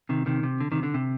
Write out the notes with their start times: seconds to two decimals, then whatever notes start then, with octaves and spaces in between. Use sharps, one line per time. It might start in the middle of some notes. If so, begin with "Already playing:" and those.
0.09 C3 D#3
0.26 C3 D#3
0.43 C3
0.60 D3
0.72 C3 D#3
0.83 D3
0.94 C3